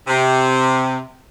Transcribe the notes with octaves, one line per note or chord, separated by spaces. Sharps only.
C3